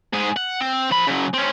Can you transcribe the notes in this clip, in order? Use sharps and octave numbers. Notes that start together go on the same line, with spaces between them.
G#2 G#4
F#5
C4
F3 B5
C#3 F#3
C4 C#4